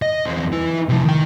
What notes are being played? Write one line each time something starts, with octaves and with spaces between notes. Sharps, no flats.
D#5
E2 C4
E3 E4
C3 F3
D#3 G5